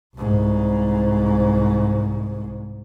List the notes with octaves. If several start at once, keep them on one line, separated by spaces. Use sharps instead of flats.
C2 G#2